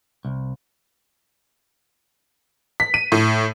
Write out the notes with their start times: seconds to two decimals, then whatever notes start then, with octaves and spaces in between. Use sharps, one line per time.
0.25 C2
2.80 B6
2.94 D#7
3.12 A2